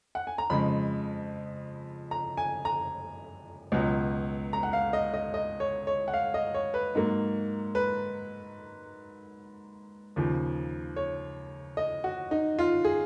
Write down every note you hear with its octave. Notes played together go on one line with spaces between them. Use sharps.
F#5
G#5
A#5
F2 C#3 G#3 B5
A#5
G#5
A#5
C#2 B2 F#3
A#5
F#5
F5
D#5
D#5
D#5
C#5
C#5
F#5
F5
D#5
C#5
B4
G#2 F#3 A#3
B4
D#2 C#3 F3
C#5
D#5
F#4
D#4
F4
G#4